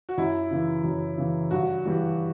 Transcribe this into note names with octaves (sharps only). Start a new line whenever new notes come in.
F#4
F#2 E4
C#3 E3
F#2
C#3 E3
G2 F#4
E3 G3